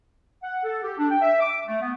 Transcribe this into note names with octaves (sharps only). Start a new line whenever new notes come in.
F#5
A4
G4
D4
G5
E5
D6
A3
B3